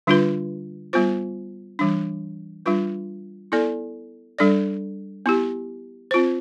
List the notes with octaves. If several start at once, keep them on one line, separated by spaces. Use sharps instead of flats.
D3 G3 D4 F4 B4
G3 B3 F4 C5
E3 G3 D4
G3 D4 F4 B4
B3 E4 A4 D5
G3 D4 A4 D5
B3 E4 G4
C4 F4 C5